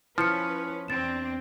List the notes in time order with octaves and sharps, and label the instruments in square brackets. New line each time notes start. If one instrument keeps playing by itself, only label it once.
[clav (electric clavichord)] F3 [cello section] C#4 B4 [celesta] E4 F6 C#7
[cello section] E2 C4 D4 [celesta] A6 E7